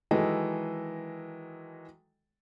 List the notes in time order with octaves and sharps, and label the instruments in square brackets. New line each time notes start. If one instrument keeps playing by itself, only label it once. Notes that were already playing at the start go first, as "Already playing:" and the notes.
[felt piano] D#3 E3 F#3 G#3 A4 D#5